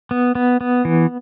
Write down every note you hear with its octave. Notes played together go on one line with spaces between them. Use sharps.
B3
B3
B3
E3